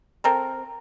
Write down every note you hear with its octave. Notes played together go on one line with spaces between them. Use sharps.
C4 A4 A#4